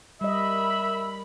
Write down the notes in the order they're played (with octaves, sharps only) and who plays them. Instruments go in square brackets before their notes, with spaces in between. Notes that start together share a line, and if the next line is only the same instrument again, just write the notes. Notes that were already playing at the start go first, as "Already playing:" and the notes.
[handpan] G3 D#5 [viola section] A#4 B5 [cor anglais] E5